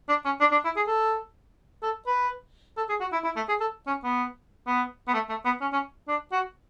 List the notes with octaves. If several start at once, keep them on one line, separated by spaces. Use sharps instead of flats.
D4
C#4
D4
D4
E4
G#4
A4
A4
B4
A4
G#4
F#4
E4
E4
A3
G#4
A4
C#4
B3
B3
B3
A3
A3
B3
C#4
C#4
D4
F#4